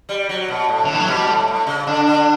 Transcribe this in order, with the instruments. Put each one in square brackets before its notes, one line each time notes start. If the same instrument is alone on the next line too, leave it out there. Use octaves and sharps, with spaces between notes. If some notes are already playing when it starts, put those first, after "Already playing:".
[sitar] G3
F#3
B2
A2
[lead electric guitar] D3
[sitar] A2 [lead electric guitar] E3
[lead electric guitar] F#3
[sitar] B2 [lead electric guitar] G3
[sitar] A2
A2
C#3
[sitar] D3 [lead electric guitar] D4
[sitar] D3